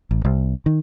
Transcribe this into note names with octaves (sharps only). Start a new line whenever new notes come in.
A1
C2
D#3